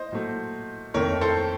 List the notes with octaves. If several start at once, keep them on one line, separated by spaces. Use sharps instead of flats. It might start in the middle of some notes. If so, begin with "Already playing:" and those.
Already playing: C5 D#5
A#2 F#3 A3
F2 D#3 A3 A#4 C#5
A4 C5